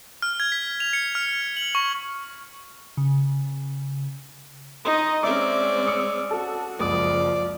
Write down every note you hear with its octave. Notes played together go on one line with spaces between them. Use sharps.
F6
G#6
B6
F7
C#7
F6
F#7
C#6
C#3
D#4 D#5 C6
G#3 C4 C#4 D5 E5 D6
D#6 E6 C#7
F#4 A4
F#1 C#2 F3 D5 D#6